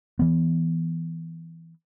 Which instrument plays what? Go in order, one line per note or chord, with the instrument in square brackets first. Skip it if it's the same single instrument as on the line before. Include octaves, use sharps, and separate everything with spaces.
[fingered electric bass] E3 B3